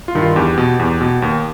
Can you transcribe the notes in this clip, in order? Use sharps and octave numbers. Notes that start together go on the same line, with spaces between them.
F4
G2 D#3
F4
E2 G4
B2
E2
B2
D#2